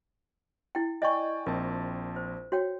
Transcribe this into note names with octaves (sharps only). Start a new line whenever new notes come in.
E4 G5
D5 D#5 G5 G#5 C#6
A#1 C4 A#4 A5
C5
F#4 C#5 G5